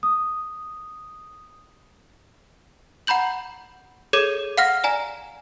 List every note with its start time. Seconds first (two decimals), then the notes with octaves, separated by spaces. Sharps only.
0.03 D#6
3.07 F#5 A#5 B5 G6 F#7
4.13 G#4 A4 C#5 D6 G#6 D#7
4.57 F5 F#5 F6 A#6
4.84 D5 G#5 A#5